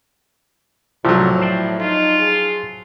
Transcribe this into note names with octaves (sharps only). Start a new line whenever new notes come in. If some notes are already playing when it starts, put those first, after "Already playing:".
C2 A2 C3 F3 F#3 A3
C5 D5 G5
D#4 F4
G#4